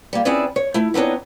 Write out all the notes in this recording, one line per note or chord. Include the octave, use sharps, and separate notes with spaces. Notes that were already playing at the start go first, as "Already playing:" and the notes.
G3 A#3
C4 C#4 E4 G#4 B4 D5
C#5
A3 E4
B3 C4 D4 D#4 C#5